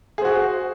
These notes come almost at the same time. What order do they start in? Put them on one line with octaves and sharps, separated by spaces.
G#4 C5 F#4